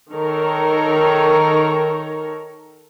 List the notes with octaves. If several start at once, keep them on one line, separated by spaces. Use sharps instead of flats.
D#3 A4 A#4 C#5 A#5